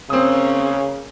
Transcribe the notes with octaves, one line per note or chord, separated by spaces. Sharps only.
C#3 A#3 C4 C#4 D#6